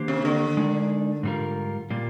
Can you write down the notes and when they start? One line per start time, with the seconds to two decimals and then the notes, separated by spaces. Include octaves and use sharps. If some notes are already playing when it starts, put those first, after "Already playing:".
Already playing: D#3 A#3 D4 G4 C5
0.08 C3
0.25 D3
0.57 G#3 D#4 A#4 D5
1.23 G#2 G3 D4 F4 A#4
1.90 A#2 G3 A#3 F4